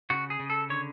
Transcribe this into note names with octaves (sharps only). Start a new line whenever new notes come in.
C#3 F#4
G#4
C#3
A4
D3 C#5